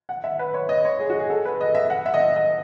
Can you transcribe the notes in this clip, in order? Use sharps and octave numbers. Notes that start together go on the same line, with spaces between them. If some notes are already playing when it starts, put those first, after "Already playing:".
F#5
E5
B4
C#5
D#5
C#5
G#4
F#4
G#4
A4
B4
D#5
E5
F#5
E5
D#5
E5
D#5